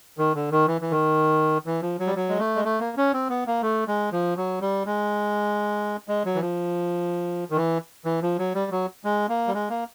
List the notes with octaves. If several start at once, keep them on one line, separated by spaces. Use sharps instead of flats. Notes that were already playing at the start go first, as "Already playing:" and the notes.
D#3
D3
D#3
E3
E3
D#3
E3
F3
F#3
G3
F#3
G#3
A3
G#3
A3
A#3
C#4
C4
B3
A#3
A3
G#3
F3
F#3
G3
G#3
G#3
F#3
E3
F3
D#3
E3
E3
F3
F#3
G3
F#3
G#3
A#3
G3
G#3
A#3